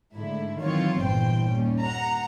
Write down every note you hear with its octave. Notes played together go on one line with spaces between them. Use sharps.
G#2 D3 A3 E4
D#3 E3 F#3 C4 F4 C#5
G1 G2 A#2 E3 C5 G5
D#2 G3 C#4
F#5 A#5